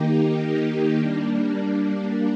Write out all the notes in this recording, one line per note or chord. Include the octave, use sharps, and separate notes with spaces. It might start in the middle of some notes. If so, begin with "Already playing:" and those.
Already playing: D#3 A#3 D#4 G4
G3 A#3 D4